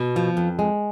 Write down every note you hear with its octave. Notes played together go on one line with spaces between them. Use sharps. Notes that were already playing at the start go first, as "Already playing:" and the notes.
Already playing: B2
F3
F2
G#3